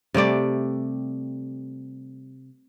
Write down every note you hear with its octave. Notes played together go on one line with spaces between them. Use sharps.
C3 G3 A3 D5